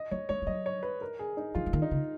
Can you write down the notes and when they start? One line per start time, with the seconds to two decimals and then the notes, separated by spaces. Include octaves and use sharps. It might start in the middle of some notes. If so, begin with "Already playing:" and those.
Already playing: D#5
0.11 F#3 C#5
0.29 G#3 C#5
0.42 F3
0.47 F#3 D#5
0.66 C#5
0.83 B4
1.01 A#4
1.19 G#4
1.37 D#4
1.55 F3 F4
1.66 F3
1.73 D#3
1.82 D#4
1.91 C#3